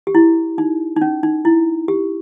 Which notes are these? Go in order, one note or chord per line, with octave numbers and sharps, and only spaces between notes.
G4
E4
D#4
D#4
C#4
D#4
E4
G4